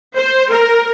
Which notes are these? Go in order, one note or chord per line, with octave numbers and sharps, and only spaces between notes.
C5
A#4